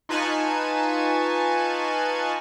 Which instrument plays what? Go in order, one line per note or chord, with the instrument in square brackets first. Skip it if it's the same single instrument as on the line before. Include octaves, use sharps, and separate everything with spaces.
[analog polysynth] D#4 F4 B4 G#5 A5 C#6